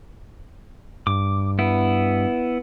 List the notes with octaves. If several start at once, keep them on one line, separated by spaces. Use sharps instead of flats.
G2 D6
B3 E4